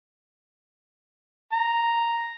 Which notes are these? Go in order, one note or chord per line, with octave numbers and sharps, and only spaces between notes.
A#5